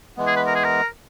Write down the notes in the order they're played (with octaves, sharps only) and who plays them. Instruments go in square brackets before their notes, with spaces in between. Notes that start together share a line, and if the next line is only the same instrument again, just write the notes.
[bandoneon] E3 G#3 B3
[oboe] G#4
B4
A#4
G#4
A#4